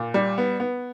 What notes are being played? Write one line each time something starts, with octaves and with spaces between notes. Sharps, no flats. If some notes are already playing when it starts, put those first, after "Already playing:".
Already playing: A#2
G3
B3
B3